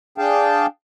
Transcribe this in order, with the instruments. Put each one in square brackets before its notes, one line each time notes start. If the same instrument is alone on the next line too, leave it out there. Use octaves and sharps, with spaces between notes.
[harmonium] D4 G#4 F5 G5 A5